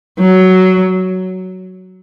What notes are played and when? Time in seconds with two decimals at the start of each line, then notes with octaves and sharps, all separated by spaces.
0.19 F#3